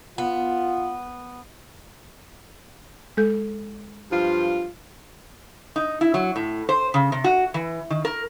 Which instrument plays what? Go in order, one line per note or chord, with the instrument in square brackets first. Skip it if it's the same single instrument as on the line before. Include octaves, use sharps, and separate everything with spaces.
[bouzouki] B3 [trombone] F4
[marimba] G#3 A4 G6
[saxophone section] G2 F3 F4
[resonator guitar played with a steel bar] D#4
E4
F#3
A2
C5
C#3
C3
F#4
E3
D#3
A#4